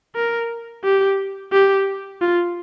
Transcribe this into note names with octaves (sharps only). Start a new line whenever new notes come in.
A#4
G4
G4
F4